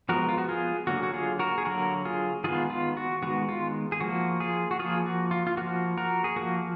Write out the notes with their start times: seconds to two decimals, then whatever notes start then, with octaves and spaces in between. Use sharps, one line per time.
0.09 F3 G#3 B3 F#4 A#4
0.29 F4
0.38 F#4
0.49 F4 G#4
0.87 D3 F#3 A#3 F#4
1.03 F#4
1.14 F4 G#4
1.39 F#4 A#4
1.58 G#4
1.65 D3 F#3 A#3 F#4 A#4
2.05 F4 G#4
2.44 D#3 G#3 B3 F4 G#4
2.70 F4
2.97 F#4
3.22 D#3 G#3 B3 F#4
3.49 F4
3.92 G#4
4.00 F3 A#3 F#4
4.40 F4 G#4
4.71 F#4
4.79 F3 A#3 F4 G#4
5.06 F#4
5.31 F4
5.47 F4
5.57 F3 A#3 F#4
5.98 F#4 A#4
6.24 G#4
6.36 F3 A#3 F#4